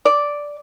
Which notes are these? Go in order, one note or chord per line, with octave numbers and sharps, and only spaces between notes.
D5